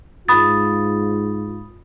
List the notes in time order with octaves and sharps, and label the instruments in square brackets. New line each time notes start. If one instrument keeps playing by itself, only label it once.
[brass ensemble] G#2 F4 [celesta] B5 D#6 A6